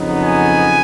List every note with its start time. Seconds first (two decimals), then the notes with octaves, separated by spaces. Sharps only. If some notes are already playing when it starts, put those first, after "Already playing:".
Already playing: F2 C#3 F#3 B3 D#4
0.22 G#5